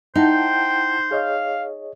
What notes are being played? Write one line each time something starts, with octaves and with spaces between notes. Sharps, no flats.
D#4 E4 C5 F#5 G5 A5
G#4 C#5 D#5 F5